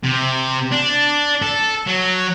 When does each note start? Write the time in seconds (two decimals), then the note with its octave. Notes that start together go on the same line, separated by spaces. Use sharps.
0.03 C3
0.72 D4
1.42 A4
1.87 F#3